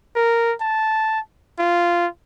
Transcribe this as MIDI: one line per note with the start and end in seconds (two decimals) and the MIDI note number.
0.16 0.53 70
0.61 1.20 81
1.59 2.07 65